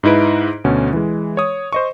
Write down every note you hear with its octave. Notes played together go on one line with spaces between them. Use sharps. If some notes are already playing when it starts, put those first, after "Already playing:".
G#2 D#4 E4 B4 D7
D2 B2 C#4
E3 G#3
C#5 D#6
C5 D#5 C#6